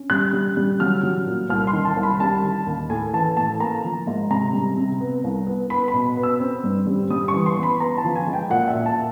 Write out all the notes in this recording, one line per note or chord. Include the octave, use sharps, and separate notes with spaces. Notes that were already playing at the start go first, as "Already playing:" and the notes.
Already playing: C#4
G3 F#6
G3
G3
F#3 F6
F#3
A#2
C2 F6
C6
D#3
A5
C2
B5
G3 A5
D#3
D#2
A2 G#5
E3 A5
A2 A5
A#3 A#5
F3
G#2
C3 A#5
G3
C3
B3
C2
B3
B3 B5
B5
B2
B3
E6
C4
G2
G3
G3 D#6
C#6
E3
C6
B3 C6
B5
B3 A#5
A5
F3
G#5
G#3
G5
A#2 F#5
E5
A#2
A5